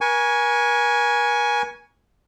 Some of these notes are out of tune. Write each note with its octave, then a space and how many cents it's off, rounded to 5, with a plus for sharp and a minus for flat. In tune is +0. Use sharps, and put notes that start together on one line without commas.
A#4 +45 G#5 +0 C#6 +15